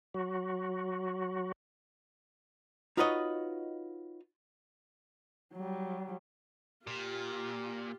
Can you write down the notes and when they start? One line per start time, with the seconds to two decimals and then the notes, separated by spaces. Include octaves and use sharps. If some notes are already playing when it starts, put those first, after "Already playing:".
0.14 F#3 F#4
2.97 D#4 F4 F#4 B4 C#5 D#5
5.54 F#3 G3
6.87 A#2 F4 G4